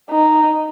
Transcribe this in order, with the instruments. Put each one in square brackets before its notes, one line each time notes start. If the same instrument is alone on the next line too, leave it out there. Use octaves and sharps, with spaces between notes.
[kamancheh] D#4